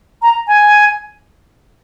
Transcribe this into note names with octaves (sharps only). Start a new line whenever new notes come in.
A#5
G#5